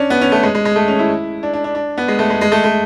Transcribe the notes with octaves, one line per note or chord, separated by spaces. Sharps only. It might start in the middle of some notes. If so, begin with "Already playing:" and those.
Already playing: C#4 D4
B3
C#4
A3
G#3
G#3
G#3
A3
C#4
E4
D4
D4
D4
D4
B3
G#3
A3
G#3
G#3
A3
A3